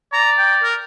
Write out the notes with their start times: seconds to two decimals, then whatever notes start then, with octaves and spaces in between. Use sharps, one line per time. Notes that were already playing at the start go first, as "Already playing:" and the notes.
0.13 D5 A#5
0.38 G5
0.63 A#4